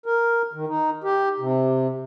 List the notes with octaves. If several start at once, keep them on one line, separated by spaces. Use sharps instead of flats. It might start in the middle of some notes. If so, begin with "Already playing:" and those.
A#4
D#3
D#4
G4
C3